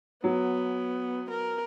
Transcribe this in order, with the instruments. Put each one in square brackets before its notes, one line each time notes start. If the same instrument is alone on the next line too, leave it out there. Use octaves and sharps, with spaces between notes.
[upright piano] F#3 [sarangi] B3
[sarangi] A#4